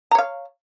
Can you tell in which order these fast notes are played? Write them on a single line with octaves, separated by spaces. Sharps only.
A#5 C#5 F5